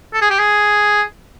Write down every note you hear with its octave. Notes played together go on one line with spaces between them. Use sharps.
A4
G#4
G4
G#4